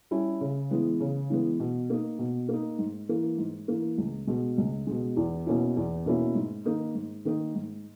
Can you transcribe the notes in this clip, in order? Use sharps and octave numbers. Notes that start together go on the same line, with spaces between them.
G3 C#4 E4
C#3
E3 G#3 B3
C#3
E3 G#3 B3
B2
A#3 D#4
B2
A#3 D#4
G#2
E3 A#3
G#2
E3 A#3
C#2
B2 G#3
C#2
B2 G#3
E2
B2 A#3 C#4 E4
E2
B2 A#3 C#4 E4
G#2
D#3 A#3 D#4
G#2
D#3 A#3 D#4
G#2